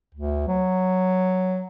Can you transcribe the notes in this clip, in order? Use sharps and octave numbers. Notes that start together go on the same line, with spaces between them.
D2
F#3